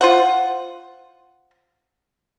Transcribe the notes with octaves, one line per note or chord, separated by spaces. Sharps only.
F4 C5 F#5